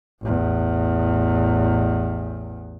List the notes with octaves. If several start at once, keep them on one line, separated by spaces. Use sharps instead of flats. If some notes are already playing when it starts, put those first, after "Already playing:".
A1 E2